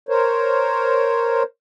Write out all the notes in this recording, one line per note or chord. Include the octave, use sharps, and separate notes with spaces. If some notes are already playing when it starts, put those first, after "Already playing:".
A#4 C5 C#5